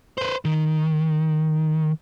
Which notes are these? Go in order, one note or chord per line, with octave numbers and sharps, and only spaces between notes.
B4 C5
D#3